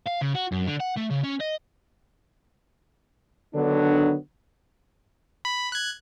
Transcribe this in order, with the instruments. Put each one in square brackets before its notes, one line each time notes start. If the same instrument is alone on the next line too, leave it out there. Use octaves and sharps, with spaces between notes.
[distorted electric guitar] F5
C#3
F#4
F#2
D3
F#5
A3
C#3
C#4
D#5
[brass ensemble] D3 D#3 F#3 B3 D4
[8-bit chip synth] B5
F#6 G#6